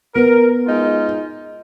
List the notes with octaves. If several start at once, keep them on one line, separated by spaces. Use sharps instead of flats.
B3 A#4
G#3 D#4 F4